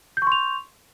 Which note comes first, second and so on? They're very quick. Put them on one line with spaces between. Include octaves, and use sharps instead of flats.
G6 C#6 C6 F7